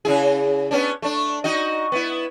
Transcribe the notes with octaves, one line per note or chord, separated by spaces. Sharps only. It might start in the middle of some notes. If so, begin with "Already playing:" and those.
C#3 E4 G#4
B3 C#4 D4
A3 D4
D#4 F#4 D#5
B3 E4